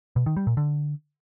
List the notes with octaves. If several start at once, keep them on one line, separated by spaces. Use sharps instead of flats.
B2
D#3
G3
A#2
D3